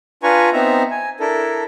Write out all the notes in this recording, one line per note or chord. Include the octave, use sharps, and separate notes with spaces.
D4 F4 B4 G#5 A#5 C#6
B3 C4 D#4 E5 A#5
G#5
D4 E4 A4 A#4